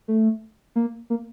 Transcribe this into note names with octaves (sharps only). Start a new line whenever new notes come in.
A3
A#3
A#3